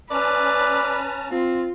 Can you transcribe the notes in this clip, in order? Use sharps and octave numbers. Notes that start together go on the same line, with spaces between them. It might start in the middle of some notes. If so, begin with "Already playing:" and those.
C#4 B4 D5 A5 A#5
C4 F4